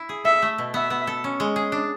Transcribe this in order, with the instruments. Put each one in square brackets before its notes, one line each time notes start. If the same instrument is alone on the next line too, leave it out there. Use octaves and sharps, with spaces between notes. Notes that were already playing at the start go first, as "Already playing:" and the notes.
Already playing: [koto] E4
G#4
[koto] A4 [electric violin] E5
[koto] A3
B2
[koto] B3 [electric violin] E5
[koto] B3
A4
C#4
G#3
G#4
D4